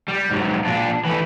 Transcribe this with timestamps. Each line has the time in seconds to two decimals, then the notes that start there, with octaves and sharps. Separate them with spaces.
0.08 G3
0.31 G#2 F#3
0.65 A#2 D4
1.05 E3 A3